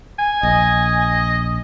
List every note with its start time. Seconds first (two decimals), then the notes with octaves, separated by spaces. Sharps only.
0.19 G#5
0.43 A#1 D#5